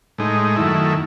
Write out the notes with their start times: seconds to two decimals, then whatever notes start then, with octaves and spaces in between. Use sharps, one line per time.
0.18 A2 G#3 D#4
0.56 F#2 D#3 A3 E4